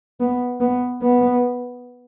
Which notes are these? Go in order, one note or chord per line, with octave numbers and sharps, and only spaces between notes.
B3
B3
B3